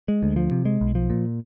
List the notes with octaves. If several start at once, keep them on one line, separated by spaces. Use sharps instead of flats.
G#3
D2
F3
C3
G#3
B1
F3
A#2